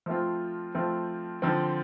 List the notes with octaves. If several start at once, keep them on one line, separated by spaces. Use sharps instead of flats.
F3 A3 C4 F4
F3 A3 C4 F4
D3 F3 C4